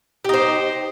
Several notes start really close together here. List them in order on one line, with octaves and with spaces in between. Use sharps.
G4 D#4 C5